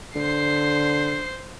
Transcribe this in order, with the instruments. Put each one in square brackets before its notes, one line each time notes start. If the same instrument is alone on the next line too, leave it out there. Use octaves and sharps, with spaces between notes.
[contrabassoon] D3 [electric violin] C5 C7